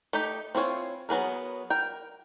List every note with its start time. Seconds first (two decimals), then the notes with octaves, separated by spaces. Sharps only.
0.13 A3 D#4 G4
0.55 C4 E4 F4 C#5 G#5
1.09 F#3 B3 G#4 A#4
1.70 A#4 G5